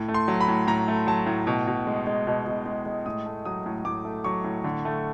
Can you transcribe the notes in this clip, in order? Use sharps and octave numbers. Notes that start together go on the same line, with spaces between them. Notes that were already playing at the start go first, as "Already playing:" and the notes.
Already playing: A2
A3
C6
F#3
B5
A2
A2 A#5
A3
F#3 A5
A2
B2
B2
G#3
G#3
B2
B2
G#3
G#3
A2 D#6
A3
F#3 D#6
A2
A2 D6
A3
F#3 C#6
A2
D3
A3